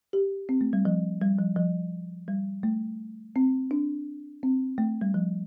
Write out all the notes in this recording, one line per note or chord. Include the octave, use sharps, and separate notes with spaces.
G4
C4
A3
G3
F3
G3
F3
F3
G3
A3
C4
D4
C4
A3
G3
F3